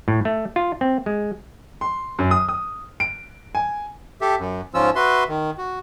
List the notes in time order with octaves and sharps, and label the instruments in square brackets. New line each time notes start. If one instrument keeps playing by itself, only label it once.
[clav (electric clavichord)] A2
A3
F4
C4
G#3
[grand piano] C6
F#2
D#6
D#6
D7
G#5
[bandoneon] G4 A4 E5
F#2
G#2 F3 C#4 F4 E6
F#4 B4 E5 C6
D#3
F#4